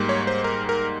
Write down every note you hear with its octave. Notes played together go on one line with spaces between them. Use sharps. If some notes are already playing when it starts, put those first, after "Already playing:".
Already playing: G#2 G3 A#3
C#5
C5
A#4
A#4